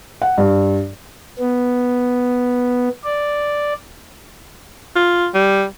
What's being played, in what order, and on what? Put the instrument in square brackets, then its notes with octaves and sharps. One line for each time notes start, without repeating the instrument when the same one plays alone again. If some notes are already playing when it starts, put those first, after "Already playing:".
[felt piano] F#5
G2
[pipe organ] B3
D5
[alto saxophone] F4
G3